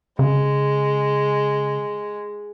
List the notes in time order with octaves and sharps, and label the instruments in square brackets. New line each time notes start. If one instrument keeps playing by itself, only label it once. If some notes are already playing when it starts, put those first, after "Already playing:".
[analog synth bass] C#3 [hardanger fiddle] G#3